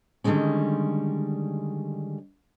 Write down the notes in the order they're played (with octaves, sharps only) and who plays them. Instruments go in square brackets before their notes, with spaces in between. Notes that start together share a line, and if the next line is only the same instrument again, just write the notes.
[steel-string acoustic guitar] D3 D#3 G3 G#3 C#4